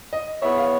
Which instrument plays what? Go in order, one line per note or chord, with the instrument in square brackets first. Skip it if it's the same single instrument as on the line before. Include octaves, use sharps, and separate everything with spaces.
[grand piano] D#5
[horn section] B3 E4 G#4 C#5 [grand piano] E5
[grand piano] F5